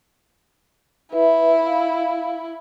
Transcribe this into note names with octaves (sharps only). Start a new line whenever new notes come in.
E4 B4 E5
F5